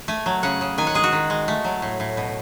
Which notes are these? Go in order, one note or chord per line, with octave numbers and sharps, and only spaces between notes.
A3 G#5
F#3
C#3 F#5
C#3
D#3 G#5
F#5
G#3 G#4
F#4
D#3
G#3
A3
F#3
A2
A2
B2